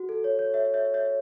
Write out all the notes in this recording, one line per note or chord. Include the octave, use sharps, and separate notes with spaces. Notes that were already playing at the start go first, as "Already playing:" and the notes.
Already playing: F#4
A4
C#5
C#5
C#5 E5
C#5 E5
C#5 E5